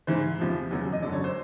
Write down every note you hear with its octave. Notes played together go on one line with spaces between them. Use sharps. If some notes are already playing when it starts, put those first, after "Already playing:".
G#2 E3 C5
E2 C3 F3
E2 C#3 F#3
D#5
F#2 D3 F#3 D5
C#5
C5